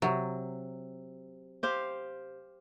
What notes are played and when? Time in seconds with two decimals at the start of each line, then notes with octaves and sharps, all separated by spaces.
0.02 C3 F#3
1.63 G4 C5 F5